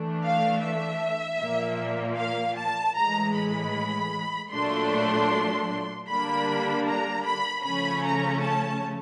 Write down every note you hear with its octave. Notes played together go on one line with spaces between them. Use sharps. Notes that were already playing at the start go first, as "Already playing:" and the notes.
Already playing: E3 A3 D4
F5
E5
A#2 F3 A#3
F5
A5
A2 E3 G#3 A#5
B5
A#2 F#3 A3 D4 C6
D3 G3 A#3 D4 B5
A#5
B5
C#3 F3 A3 C#4 B5
A#5
A5